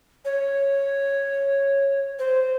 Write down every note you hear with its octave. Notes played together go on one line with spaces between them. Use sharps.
C#5
C5